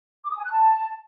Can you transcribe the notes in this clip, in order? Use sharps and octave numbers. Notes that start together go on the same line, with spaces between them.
D6
D#6
G#5
F#6
A5